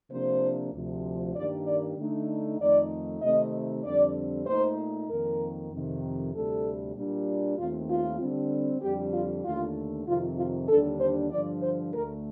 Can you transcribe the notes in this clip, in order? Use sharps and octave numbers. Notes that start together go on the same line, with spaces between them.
C3 F3 A#3 D4 C5
D2 C3 F3
G2 D#3 G3 A#3 D5
D5
D3 A3 D#4
F2 D#3 A3 D#4 D5
C3 D#3 A3 C4 D#4 D#5
F2 D3 G3 C4 D5
A#2 A3 D#4 C5
F2 D#3 A#3 A#4
F2 C3 D#3
D2 C3 G3 A4
A#2 G3 D4
D#2 D#3 A3 C4 F4
F4
D3 G3 C4
F2 D3 G3 G4
F4
D#2 D3 A3 F4
F2 C3 D#3 F4
F4
D#2 D3 G3 D4 A4
C5
G2 D3 F3 D5
C5
D2 D3 A3 A#4